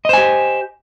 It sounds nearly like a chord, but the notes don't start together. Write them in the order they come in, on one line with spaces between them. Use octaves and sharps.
D#5 C5 G#5 G4